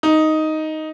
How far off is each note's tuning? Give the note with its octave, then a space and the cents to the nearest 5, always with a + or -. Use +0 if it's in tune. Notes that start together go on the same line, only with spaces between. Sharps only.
D#4 +5